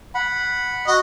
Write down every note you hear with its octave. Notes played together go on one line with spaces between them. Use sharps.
F#5 B5
F#4 D#5